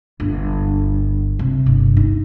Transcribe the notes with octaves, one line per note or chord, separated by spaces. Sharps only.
G1
C3
G1
D#4